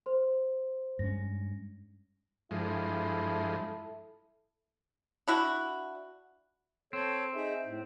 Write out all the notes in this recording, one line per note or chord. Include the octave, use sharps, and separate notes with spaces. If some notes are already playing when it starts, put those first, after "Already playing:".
C5 C6
G2 G#3 C#4 A#6
G2 F3 G#3 E4 A4
D4 E4 F#4
C4 A4 C#5
D#4 G#4 E5
A2